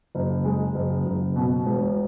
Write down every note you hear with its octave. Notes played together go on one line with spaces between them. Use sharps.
F#1
G#3
F#1
F#1
B2
E1